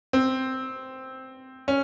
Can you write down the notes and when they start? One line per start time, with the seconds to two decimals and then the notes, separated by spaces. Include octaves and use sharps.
0.13 C4
1.68 C#4